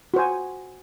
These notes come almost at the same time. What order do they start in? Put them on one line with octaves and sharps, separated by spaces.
F#4 C5 G#5